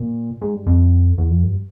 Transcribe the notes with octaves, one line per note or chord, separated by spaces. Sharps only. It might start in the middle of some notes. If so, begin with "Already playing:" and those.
Already playing: A#2
G#2
G2
F2
E2
F2
G2